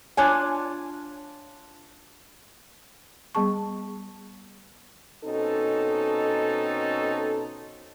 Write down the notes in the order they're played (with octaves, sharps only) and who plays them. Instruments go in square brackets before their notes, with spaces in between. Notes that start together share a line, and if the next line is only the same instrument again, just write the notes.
[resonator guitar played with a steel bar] D4 F4 C#5 G#5
[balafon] G3 B3 G#4 A5 C#6
[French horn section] B2 C4 C#4 D#4 A4